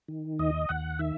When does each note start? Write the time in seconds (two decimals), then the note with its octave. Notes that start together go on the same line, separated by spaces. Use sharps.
0.08 D#3
0.39 D#2 D#5
0.69 D#2 F#5
0.99 D#3 E5